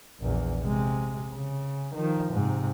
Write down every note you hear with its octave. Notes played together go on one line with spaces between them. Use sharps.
A#1 E2
C3 G#3
C#3
D#3 F3
G#2 C3